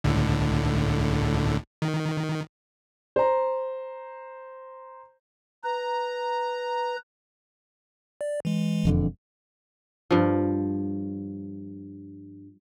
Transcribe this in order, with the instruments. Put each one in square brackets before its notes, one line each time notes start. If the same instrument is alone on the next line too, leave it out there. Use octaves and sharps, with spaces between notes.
[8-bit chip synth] C#2 A2 D3
D#3
[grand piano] C5 A#5
[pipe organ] B4 [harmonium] A#5
[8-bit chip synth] D5
E3 G#3
[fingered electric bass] E1 F2 D3
[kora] G2 F3